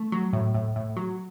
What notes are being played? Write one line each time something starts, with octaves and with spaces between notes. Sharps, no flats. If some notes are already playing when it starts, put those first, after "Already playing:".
Already playing: A3
F#3
A2
A2
A2
F#3